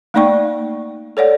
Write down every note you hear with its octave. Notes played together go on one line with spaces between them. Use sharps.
A3 A#3 D#4 D5 G5 C#6
A4 C#5 D5 F#5